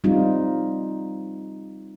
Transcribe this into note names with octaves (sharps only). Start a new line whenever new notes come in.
G3 C4 D#4 F4